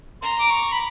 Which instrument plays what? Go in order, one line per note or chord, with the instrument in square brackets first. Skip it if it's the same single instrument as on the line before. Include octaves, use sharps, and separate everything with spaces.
[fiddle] A#5 [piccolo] C6
[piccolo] D6
C#6
B5